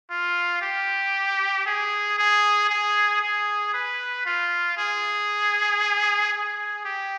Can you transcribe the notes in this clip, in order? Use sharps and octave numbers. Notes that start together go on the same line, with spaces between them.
F4
G4
G#4
G#4
G#4
G#4
B4
F4
G#4
G#4
G4